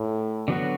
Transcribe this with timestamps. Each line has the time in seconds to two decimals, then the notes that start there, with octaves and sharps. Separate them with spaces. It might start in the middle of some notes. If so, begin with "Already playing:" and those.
Already playing: A2
0.48 D3 F#3 B3 F#4